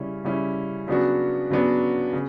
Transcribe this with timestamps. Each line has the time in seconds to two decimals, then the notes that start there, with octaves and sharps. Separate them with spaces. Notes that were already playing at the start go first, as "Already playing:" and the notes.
Already playing: C#3 G3 C#4 E4
0.25 C#3 G3 C#4 E4
0.88 C#3 F#3 B3 D4 F#4
1.51 C#3 F#3 B3 D4 F#4
2.13 C#3